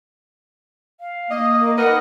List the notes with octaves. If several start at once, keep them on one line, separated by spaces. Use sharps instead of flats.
F5
A#3 D#5
A#4
D#4 A#4 B4 D#5 F#5